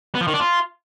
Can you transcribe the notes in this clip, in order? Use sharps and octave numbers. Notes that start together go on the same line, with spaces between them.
B3
F3
D#3
D4
F4